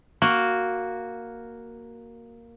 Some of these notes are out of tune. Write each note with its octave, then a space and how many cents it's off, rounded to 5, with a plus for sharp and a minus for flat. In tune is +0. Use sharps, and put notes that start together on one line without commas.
A#3 +0 F#4 +0